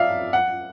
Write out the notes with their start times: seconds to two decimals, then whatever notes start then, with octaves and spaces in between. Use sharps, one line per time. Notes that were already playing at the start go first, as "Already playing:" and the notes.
Already playing: D5 E5 F5
0.33 F#5